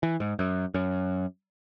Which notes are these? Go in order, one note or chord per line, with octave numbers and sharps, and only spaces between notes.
E3
G#2
F#2
F#2